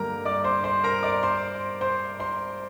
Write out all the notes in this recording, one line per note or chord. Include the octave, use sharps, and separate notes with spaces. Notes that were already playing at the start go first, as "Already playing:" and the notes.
Already playing: G2 D3 G3 A#3 G4 A#4 A#5
D5 D6
C5 C6
C5 C6
A#4 A#5
D5 D6
C5 C6
C5 C6
C5 C6